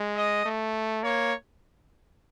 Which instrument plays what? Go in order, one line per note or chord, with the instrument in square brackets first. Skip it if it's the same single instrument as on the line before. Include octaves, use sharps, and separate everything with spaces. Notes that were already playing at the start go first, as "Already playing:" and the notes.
Already playing: [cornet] G#3
[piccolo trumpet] D#5
[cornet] A3
[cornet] A#3 [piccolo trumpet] C#5